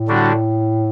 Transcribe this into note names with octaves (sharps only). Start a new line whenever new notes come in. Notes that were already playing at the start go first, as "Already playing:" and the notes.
Already playing: A2
D3 G3 D4 F#4